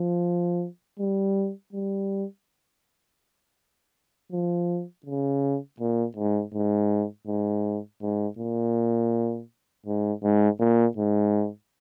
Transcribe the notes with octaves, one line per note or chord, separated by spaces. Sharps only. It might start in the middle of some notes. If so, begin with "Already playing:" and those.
Already playing: F3
G3
G3
F3
C#3
A#2
G#2
G#2
G#2
G#2
A#2
G#2
G#2
A#2
G#2